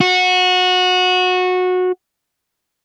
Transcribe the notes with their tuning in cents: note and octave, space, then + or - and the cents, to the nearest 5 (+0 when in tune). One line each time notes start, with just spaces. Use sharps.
F#4 -20